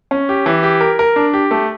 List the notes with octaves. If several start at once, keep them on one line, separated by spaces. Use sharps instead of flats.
C#4
G4
E3
G4
A#4
A#4
D4
G4
A3